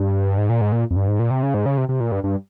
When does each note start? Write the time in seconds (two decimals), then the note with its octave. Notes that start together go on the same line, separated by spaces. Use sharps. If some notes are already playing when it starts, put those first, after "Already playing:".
Already playing: G2
0.38 G#2
0.49 A#2
0.61 G#2
0.72 A#2
0.91 F2
0.96 G2
1.08 G#2
1.19 A#2
1.31 C3
1.43 C#3
1.54 G#2
1.66 C#3
1.78 C3
1.89 C3
2.00 A#2
2.12 G2
2.24 G2